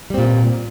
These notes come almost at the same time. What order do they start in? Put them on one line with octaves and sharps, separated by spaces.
G3 C4 A#2